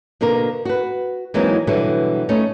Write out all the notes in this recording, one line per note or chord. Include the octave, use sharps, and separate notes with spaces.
B2 D3 A#3 A#4
F#4 B4
E3 F#3 G#3 A#3 C4 D#4
B2 D3 E3 F#3 G3
A3 C#4 D#4 C#5